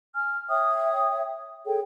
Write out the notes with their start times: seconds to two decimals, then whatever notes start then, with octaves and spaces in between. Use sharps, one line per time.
0.15 G#5 F6
0.49 C#5 E5 G5 D#6
1.66 G#4 A4 C#5 G5